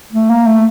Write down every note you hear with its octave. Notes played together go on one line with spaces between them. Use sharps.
A3
A#3
A3